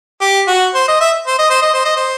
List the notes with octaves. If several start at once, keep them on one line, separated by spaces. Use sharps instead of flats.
G4
F#4
C5
D#5
E5
C5
D#5
C5
D#5
C5
D#5
C5